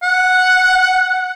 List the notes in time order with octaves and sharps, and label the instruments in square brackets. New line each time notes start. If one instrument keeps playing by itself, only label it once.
[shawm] F#5